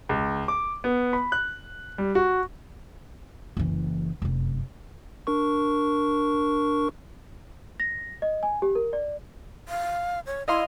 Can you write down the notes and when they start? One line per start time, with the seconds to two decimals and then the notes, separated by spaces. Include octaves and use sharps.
0.09 C#2
0.48 D6
0.84 B3
1.13 B5
1.32 F#6
1.98 G3
2.15 F#4
3.57 F#1 E3
4.22 F1 F#2
5.27 D4 A#4 C#6
7.80 A#6
8.22 D#5
8.43 G#5
8.62 G4
8.75 A#4
8.93 D5
9.68 F5
10.26 C#5
10.48 E4 D#5 F5 C6